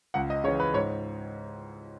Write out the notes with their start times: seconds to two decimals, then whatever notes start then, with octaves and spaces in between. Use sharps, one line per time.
0.14 C#2 F#5
0.30 D#5
0.44 C#3 C#5
0.48 E3
0.60 B4
0.74 G#2 C#5